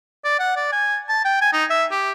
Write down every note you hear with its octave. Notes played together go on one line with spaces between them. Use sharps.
D5
F#5
D5
G#5
A5
G5
G#5
D#4
E5
G4